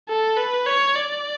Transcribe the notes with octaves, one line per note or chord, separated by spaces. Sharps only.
A4
B4
C#5
D5